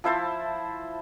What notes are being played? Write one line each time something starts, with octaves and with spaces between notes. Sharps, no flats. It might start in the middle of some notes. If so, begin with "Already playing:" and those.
F3 E4 C5 A5